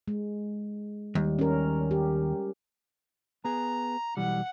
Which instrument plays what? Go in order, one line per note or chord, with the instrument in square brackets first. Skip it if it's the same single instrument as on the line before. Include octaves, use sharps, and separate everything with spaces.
[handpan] G#3
[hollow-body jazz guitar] D#2 [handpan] G3
[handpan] C#4 A#4
G4
[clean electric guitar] B3 G#4 [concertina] A#5
[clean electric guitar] B1 E3 G3 [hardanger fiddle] F#5